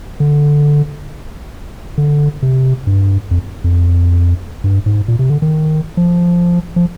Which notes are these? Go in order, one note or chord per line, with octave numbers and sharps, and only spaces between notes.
D3
D3
C3
G2
F2
F2
G2
G#2
A#2
C3
D3
D#3
F3
F3